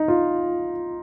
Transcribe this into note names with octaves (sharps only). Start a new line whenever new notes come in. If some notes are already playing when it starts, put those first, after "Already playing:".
Already playing: D#4
F4